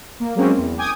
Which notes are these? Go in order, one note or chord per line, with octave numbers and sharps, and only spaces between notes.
A#3
F#3 G#3 A#3 C4 C#4
E2
G5 G#5 D6 D#6 G#6